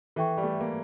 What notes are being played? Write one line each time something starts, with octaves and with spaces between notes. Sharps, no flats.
E3 A4 E5 G5 C#6
G3
A3
A#3